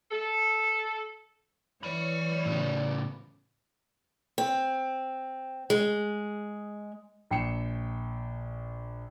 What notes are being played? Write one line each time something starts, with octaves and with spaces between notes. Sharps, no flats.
A4
E3 C#5 D5 B5
A2 C#3
C4
G#3
A#1 G5 C7 C#7 E7